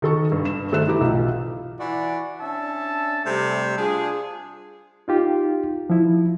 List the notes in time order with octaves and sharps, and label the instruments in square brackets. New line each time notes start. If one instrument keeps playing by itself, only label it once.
[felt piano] D#3 A4 C#6
G2
G2 E7
D#3 A3 A4 C5 F#6 E7
E3 G4 A#5 D6
B1 F4
[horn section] E3 E4 F#4 D5
C#4 D4 E5 A5
C3 G3 A3
D4 F4 G#4
[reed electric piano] D#4 F4 G4
F3 E4